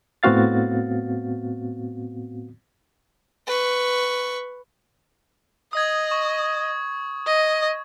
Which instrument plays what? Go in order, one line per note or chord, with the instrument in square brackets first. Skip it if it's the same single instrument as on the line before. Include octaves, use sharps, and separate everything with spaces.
[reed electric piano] A2 B3 C4 F#4 F5 A6
[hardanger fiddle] B4 C#6
[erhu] D#5 [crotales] D#6 G#6
[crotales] C#6
[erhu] D#5